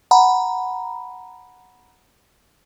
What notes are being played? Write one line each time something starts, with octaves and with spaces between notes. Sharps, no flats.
F#5 A#5 B5